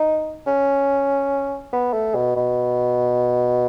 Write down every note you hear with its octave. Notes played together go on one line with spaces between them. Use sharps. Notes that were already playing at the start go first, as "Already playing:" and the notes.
Already playing: D#4
C#4
B3
A3
B2
B2